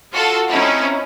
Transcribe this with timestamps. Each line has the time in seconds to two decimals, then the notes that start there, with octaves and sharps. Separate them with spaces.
0.13 F4 F#4 A4
0.49 C4 C#4 D#4 E4